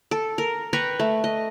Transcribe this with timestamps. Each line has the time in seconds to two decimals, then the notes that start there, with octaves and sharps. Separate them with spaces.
0.11 A4
0.38 A#4
0.73 B4 G5 A#5 C#6
0.99 A3
1.24 D#5